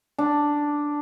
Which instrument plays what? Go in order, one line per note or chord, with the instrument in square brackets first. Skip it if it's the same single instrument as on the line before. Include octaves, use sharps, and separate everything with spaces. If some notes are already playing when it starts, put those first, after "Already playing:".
[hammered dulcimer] D4